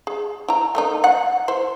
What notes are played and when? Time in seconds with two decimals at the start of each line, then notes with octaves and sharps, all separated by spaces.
0.07 G#4
0.48 E4 A#5
0.75 A3 A#3 D#4
1.04 F#5
1.48 E4 C5